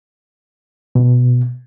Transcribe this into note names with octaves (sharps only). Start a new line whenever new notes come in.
B2